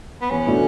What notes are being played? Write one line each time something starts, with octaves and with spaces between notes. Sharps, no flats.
B3
E2 C#4
B2 A3 D4 F#4